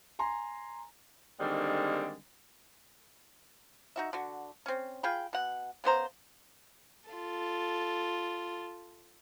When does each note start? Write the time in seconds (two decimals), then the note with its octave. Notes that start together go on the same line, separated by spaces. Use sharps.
0.19 G#5 A#5 C6
1.40 D3 D#3 G3 G#3 A#3 C4
3.96 D#4 F#4 E5
4.13 D3 F#4
4.66 C4 C#4
5.03 F4 G#4 G5 B5
5.33 B2 F#5
5.84 C#3 B3 C5 A#5
7.10 F4 A4